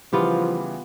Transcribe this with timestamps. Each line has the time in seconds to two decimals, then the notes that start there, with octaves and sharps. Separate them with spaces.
0.13 C#3 E3 F3 G3 B3 F4 G4